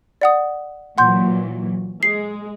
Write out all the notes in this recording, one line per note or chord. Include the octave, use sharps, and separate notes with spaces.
D5 F#5 D#6
A#2 E3 F#3 F#5 C6 G6
G#3 C7